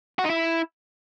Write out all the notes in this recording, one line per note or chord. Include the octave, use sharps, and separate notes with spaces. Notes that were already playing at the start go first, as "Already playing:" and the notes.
F#4
D#4
E4